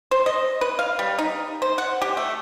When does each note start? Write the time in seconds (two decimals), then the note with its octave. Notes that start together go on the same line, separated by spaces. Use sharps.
0.11 C5
0.26 D#5
0.61 B4
0.79 F5
0.99 G3
1.19 D#4
1.62 C5
1.78 F#5
2.02 G4
2.17 A3